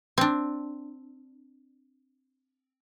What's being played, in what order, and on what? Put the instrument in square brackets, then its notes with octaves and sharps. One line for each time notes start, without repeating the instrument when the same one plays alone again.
[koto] C4 D4